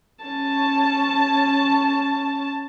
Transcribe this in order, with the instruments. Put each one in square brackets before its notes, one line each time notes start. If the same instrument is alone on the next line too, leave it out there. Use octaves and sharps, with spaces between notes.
[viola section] C#4 A5